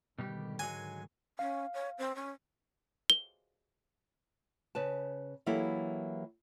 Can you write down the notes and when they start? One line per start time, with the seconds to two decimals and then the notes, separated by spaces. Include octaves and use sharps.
0.19 G#2 B2 D3 D#3 G3 G4
0.59 F#3 G#3 G#5
1.39 C#4 F5
1.74 C#5
1.98 C4
2.15 C#4
3.10 G7
4.75 C#3 B4 A5
5.46 E3 F#3 A#3 E4 G4 A4